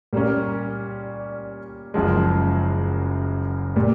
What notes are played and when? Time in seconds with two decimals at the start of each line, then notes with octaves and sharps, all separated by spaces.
0.13 A#2 G3 A#3 C#4
1.94 F#1 F#2 C#3 F3 G#3
3.76 A#2 G3